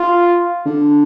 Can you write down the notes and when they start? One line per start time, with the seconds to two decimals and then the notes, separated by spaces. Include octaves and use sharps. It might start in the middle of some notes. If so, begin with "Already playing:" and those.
Already playing: F4
0.66 D3